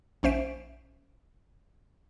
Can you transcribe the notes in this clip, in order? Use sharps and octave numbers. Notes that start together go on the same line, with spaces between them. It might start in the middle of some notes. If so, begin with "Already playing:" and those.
A#1 C#4 C5 E5 D7